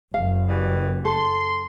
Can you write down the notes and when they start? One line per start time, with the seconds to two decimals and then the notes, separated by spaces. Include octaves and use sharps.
0.14 F#1 F#2 F5
0.48 B2 E3 G3
1.05 A4 C6